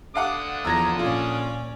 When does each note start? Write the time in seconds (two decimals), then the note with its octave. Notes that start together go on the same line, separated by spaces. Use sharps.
0.15 D3 D4 F5 F#5 D6 D#6
0.65 E2 F3 A#5 E6 G#6 A#6
0.99 A#2 C#4 F4 D5